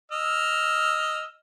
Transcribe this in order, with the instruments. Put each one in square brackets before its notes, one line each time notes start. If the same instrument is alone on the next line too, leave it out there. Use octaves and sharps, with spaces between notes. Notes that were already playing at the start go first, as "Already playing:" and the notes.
[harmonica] D#5 E6 F6